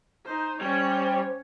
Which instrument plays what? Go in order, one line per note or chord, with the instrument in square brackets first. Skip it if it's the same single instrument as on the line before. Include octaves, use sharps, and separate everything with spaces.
[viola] D#4 C5
[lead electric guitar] G3 [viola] C#4 C#5 [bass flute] C5